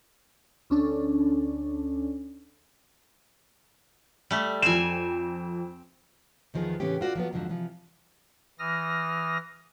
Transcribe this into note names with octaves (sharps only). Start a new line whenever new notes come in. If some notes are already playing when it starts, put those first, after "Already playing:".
D2 C#4 D4 A4
G3 A3
F2 C4 G#5 E7
E2 D#3 F3 B3 G#4
A2 C#3 E3 B3 C#4 G4
F4 F#4 B4 D5
F3 F#3 B3
F2 G#2 D3 F3 F#3
C3 E3 F3
E3 D#6 F6 A#6